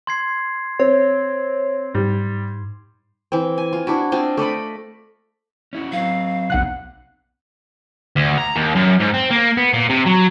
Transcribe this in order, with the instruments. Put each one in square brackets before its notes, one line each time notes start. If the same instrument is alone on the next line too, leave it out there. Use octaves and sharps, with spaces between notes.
[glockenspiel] C6 G#6 C7
[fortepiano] C4 [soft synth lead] C#5
[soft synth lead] G#2 [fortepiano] G3
[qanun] E3 C4
G#5
F4
D4 E4 F#4
C4 D4 F4 D#5
A3 D5 D#5 B5
[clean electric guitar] C#4 E4 F#4
[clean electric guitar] F#3 C4 [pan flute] F5
[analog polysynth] B1 F#5 F#6 [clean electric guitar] F2 C3
[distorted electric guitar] D2
A#5
D#2
F#2
G#2
C4
A#3
B3
A#2
C3
F#3